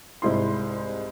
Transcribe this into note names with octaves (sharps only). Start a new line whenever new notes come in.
C2 G#2 E4 C6